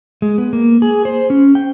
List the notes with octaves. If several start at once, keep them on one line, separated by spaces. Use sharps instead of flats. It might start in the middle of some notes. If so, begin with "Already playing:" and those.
G#3
B3
A#3
G#4
C5
C#4
G5